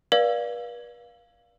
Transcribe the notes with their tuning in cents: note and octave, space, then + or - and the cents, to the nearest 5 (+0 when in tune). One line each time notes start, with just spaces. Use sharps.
B4 -45 D5 +0 F5 +0